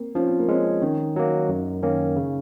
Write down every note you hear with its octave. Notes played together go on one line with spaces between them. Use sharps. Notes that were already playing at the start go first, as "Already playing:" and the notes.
Already playing: A#3 C4
F3 C#4
C4
A#3
G#3 C4 C#4
D#3 C#4
F#3 A#3 D#4
F#2
D#3 A#3 C#4
C#3